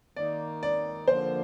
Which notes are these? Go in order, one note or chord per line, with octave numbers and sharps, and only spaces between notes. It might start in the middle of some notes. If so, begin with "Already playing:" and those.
D#3 A#3 D#4 D5
D5
D3 F3 A#3 C5